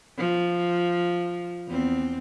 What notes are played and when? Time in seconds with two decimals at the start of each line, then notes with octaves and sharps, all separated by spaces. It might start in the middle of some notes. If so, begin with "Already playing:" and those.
0.18 F3
1.68 E2 C4